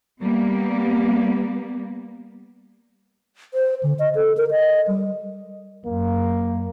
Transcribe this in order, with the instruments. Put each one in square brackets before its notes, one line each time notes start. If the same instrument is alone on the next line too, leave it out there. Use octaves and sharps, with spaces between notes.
[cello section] G3 A#3 B3
[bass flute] C5
D3
D#5
A4
A#4
D#5
G3
[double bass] F#2 [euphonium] A#3